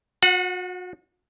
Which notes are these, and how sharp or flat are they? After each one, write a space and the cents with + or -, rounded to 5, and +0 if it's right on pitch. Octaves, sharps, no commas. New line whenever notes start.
F#4 -40 F#5 +0